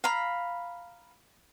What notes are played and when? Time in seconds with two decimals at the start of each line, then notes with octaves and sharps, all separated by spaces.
0.04 F5 A#5 B5